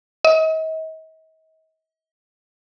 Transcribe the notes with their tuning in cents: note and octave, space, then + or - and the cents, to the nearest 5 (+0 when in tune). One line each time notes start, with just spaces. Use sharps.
D#5 +40